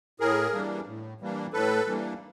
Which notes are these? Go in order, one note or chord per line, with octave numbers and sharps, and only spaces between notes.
A2 G#4 A#4
E3 G3 A#3 D4
A2
E3 G3 A#3 D4
A2 A4 B4
E3 G3 A#3 D4